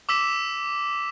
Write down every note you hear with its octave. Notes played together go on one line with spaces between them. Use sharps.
D6 E6 B6 E7